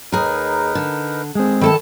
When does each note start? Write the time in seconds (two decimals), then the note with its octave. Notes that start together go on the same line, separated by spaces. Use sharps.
0.12 D#2 D#4 G#4 A#4 B4
0.75 D3
1.35 G#3 C4 G#4
1.61 D#3 E4 A4 A5